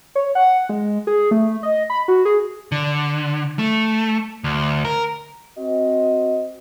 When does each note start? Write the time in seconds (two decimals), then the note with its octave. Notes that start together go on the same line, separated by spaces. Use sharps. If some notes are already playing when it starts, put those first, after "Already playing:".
0.15 C#5
0.35 F#5
0.69 G#3
1.07 G#4
1.31 A3
1.63 D#5
1.90 B5
2.08 F#4
2.25 G#4
2.72 D3
3.59 A3
4.44 D2
4.85 A#4
5.59 C4 F#4 D#5